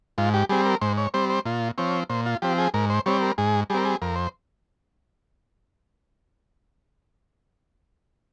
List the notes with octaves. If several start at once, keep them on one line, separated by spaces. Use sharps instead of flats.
G#2 F4
G4
G3 C4 G#4
A#4
G#2 C5
C#5
G3 C4 C5
C5
A#2 F4
F3 C4 C#5
A#2 C5
F4
F3 C4 G4
G#4
G#2 A#4
C5
G3 C4 C#5
A#4
G#2 G#4
G3 C4 G#4 A#4
G#4
F2 A#4
C5